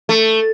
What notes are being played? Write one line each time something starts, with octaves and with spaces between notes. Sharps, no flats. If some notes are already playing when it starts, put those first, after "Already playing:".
A3